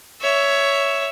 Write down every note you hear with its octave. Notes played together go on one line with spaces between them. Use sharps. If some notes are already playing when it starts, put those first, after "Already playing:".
C#5 E5